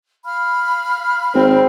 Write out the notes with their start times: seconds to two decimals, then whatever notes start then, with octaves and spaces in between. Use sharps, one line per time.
0.25 F5 B5 F6
1.35 G#1 C4